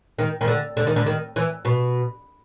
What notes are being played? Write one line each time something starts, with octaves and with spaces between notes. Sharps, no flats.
D#3
D#3
D3
D3
D#3
D3
D#3
E3
B2